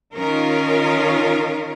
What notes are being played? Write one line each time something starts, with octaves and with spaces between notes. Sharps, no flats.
D#3 C#4 F4 A#4